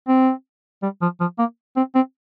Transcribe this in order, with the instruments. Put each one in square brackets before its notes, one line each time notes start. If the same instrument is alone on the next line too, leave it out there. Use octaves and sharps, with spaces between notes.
[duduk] C4
G3
F3
F3
A#3
C4
C4